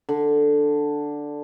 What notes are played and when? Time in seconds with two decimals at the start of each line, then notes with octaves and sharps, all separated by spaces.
0.09 D3